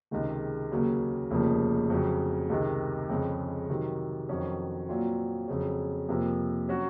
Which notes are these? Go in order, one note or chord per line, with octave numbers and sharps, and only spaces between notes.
C#2 C3 D#3 G#3
D#2 C#3 F#3 A#3
F1 D#2 C#3 F3 A#3
F2 C#3 F#3
C#2 C3 D#3
F2 C#3 G#3
C3 D#3 F#3
F2 D#3 F#3 C#4 F#4
A#2 F#3 C4 F4
F2 C#3 F#3
F2 C3 F3 A#3
F#3 C#4 F#4